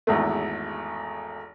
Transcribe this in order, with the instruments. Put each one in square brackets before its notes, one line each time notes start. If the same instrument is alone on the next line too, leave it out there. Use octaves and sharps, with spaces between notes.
[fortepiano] G#1 E2 A3